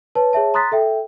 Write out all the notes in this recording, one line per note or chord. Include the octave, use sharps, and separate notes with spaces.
B4 C#5 A5
G#4 C#5 E5 A5
A#5 C6 D#6 F#6 A6 B6
A4 E5 G5